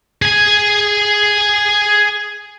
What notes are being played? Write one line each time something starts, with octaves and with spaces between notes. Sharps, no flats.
G#4 G#5